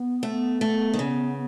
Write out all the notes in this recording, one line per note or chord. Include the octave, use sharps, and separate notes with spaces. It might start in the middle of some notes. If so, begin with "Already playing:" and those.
Already playing: B3
A3
A3
D#3
C#3